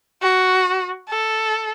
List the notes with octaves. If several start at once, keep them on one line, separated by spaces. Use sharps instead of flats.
F#4
A4